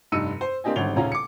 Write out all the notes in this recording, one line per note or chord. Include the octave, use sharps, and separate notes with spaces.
F1 G2 D#4 E6 C#7 D#7
C5
A#3 C4 D4 G4 D#5 G#5
G#1 D3 G3 C#4 F7 G7
D#1 C#3 C#4 F4 A#5
D6 C#7